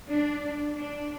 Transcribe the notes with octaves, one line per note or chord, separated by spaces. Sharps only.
D4
D4